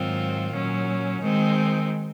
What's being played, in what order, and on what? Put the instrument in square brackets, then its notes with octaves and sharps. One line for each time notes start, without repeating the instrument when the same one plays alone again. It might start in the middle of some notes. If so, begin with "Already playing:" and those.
Already playing: [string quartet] G#2 D#3 F#3 C4 F4
A#2 F#3 C#4
D#3 G#3 C4